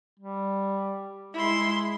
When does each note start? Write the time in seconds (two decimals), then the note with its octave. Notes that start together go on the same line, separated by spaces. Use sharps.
0.20 G3
1.34 G#3 E4 C6